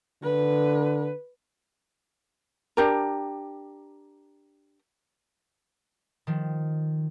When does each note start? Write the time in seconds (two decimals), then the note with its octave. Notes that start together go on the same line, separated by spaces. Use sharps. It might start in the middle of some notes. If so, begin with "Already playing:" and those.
0.23 D3 B4
2.77 D4 G4 A#4
6.27 D#3 F3